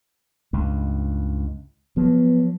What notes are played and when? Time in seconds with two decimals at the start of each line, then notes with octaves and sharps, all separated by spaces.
0.53 C#2 G2
1.97 F3 F#3 B3